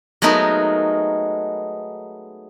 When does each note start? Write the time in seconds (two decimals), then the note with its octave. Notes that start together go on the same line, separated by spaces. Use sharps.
0.22 F#3 G#3 A3 B3 D#4 A#4